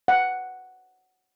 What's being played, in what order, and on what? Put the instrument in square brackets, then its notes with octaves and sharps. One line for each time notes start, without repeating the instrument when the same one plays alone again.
[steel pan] F#5